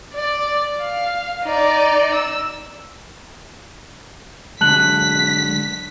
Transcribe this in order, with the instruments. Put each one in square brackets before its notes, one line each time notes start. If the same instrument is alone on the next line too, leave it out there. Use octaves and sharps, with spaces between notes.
[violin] D5
F5
D#4 D5
E6
[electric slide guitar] D3 F#3 G#3 [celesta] A5 F#6 F#7 [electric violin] B6